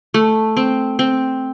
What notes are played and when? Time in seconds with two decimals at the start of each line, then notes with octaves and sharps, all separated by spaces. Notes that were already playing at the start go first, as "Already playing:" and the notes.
0.14 A3
0.57 C4
0.99 C4